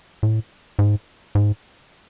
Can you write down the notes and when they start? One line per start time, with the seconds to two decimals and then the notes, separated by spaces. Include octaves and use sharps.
0.23 A2
0.79 G#2
1.35 G#2